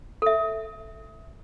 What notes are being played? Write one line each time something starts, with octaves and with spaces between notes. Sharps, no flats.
A4 E5